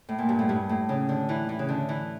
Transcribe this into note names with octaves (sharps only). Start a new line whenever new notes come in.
A2
A#2
G2
A2
G2
A2
C#3
D3
E3
E3
C#3
D3
E3